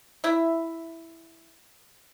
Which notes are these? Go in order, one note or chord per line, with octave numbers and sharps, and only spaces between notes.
E4 E5